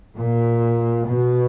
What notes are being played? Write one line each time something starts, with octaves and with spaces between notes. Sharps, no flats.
A#2
B2